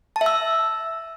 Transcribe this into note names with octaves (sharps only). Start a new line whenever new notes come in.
A5
E5
E6